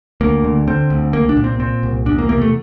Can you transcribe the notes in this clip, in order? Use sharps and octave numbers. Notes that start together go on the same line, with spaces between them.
D2 A#3
D3
D3 C4
D2
C2 A#3
D4
A#2
C4
A#2 C4
C2
E2 D4
A#3
C3 A#3
A3